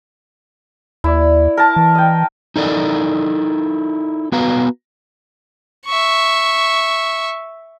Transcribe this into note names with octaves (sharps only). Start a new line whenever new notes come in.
D#2 E4 D5
A#4 A5
E3
D#5 G5
D#4 E4 A4 A#4 D5 D#5
B3 F#4 B4 F5 A#5
E5 C#6